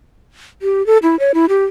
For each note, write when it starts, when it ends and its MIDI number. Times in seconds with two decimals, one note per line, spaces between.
0.62 0.85 67
0.86 0.98 69
1.03 1.18 64
1.19 1.32 73
1.34 1.46 64
1.49 1.65 67